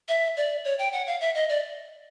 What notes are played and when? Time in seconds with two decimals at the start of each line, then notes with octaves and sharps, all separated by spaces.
0.09 E5
0.37 D5
0.65 C#5
0.79 G5
0.93 F#5
1.07 F5
1.21 E5
1.35 D#5
1.49 D5